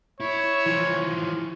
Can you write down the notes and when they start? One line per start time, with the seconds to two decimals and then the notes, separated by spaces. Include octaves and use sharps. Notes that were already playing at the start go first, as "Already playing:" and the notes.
0.20 E4 C#5
0.66 E3 F3